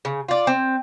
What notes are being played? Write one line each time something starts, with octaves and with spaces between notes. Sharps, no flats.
C#3
F4 D5
C4